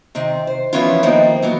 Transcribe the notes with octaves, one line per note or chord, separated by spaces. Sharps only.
C3 D#3 C4
C5
E3 F3 B3 C#4 E4 F4
D#3 F3 A#3 C4 D4 D#4
E3 F#3 A#3 B3